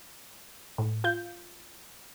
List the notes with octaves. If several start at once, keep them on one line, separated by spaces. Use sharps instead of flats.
A2
F4 G6